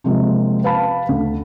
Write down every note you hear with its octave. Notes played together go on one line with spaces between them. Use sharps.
C3 F3 G#3 A#3 C4
B4 F5 A5 B5
D2